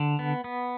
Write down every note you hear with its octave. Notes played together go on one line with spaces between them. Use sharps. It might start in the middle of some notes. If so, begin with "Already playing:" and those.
Already playing: D3
B3
B3